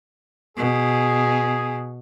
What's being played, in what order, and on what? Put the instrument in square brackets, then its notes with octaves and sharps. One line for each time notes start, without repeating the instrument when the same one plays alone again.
[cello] B2 [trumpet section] G#4